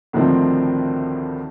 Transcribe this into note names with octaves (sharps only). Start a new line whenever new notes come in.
D2 A2 C3 D#3 F3 C4